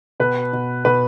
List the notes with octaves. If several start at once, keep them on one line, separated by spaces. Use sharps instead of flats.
B2 B4
B2
B2 B4